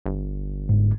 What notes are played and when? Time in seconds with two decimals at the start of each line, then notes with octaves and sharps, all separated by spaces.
0.06 G1
0.69 G#2